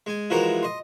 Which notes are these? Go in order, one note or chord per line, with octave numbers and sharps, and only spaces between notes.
G#3 G#5
E3 F3 G#3 F#4 A#4 A#5
D#5 C6